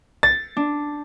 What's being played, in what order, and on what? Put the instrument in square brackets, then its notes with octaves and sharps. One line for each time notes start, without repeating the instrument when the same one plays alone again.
[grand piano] A6
[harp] D4